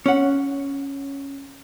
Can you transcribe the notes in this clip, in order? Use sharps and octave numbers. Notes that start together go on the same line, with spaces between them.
C#4 F#5